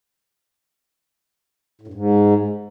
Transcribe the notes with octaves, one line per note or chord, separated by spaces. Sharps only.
A2
G2
G#2